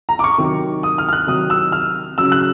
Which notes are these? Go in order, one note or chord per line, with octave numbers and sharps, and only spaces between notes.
A#5
D6
C#6
C3 D#3 F#3
D#6
F6
F6
F#6
C3 D#3 F#3 D#6
E6
F6
C#3 F#3 E6
F#6